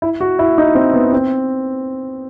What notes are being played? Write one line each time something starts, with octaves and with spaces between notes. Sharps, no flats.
E4
F#4
E4
D#4
C4
B3
C4